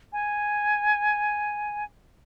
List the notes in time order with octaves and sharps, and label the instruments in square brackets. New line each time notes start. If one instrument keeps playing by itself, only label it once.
[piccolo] G#5